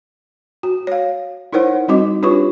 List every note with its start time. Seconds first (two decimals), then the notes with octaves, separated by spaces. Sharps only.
0.63 F#4
0.87 C#5 F5
1.53 D#4 E4 A#4 C5 C#5 F#5
1.88 G3 C4 D#4 F#4 D#5 D6
2.23 D4 F4 G4 B4 C#5 C#6